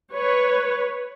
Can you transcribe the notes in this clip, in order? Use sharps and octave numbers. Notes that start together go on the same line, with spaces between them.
B4 C#5